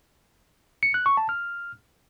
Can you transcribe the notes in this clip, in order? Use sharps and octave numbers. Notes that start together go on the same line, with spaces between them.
C#7
F#6
C#6
A5
F6